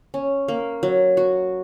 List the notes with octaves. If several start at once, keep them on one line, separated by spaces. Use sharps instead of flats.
C#4
A#3
F#3
F#4